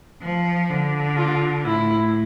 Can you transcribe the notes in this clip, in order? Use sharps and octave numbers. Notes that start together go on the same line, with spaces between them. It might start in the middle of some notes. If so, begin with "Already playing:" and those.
F3
D3
F4
A2 E4